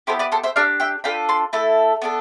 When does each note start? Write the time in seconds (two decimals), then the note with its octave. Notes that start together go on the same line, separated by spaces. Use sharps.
0.07 B3 E4 G4 A4 C5
0.19 B4 D5
0.32 A4 C5
0.44 C5 E5
0.56 D4 G4 D5 F5
0.80 E5 G5
1.04 D4 F4 A4 G5 B5
1.29 A5 C6
1.53 A3 E4 A4
2.02 B3 D4 A4